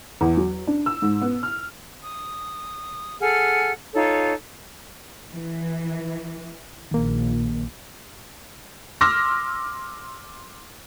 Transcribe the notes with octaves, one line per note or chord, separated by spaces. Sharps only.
E2
F#3
D4
E6
G#2
B3
F6
D#6
G#4 A4 F#5 F6
D#4 F4 A4 C#5
E3
A#1 D#3 A#3
C6 D6 E6 F6 A#6